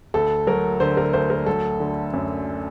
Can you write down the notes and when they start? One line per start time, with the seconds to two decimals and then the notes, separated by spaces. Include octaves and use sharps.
0.14 D2 A4
0.47 F#3 A#4
0.80 D3 C5
0.97 A#4
1.13 D2 C5
1.30 A#4
1.46 F#3 A4
1.80 D3
2.13 F#2